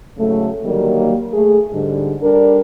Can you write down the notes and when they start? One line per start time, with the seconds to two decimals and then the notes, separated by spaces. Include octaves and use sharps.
0.17 G#2 C#3 F#3 A3
0.64 D3 D#3 F#3 G3 A#3
1.32 A3 G#4
1.72 G#2 D3 G3
2.21 G3 D4 A4 A#4